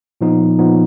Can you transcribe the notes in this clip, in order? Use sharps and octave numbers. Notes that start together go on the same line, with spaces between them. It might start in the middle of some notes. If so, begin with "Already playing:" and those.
A#2 F3 B3 D#4
A#2 F3 B3 D#4